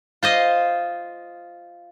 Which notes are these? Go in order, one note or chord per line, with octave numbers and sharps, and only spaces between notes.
F4 C5 D#5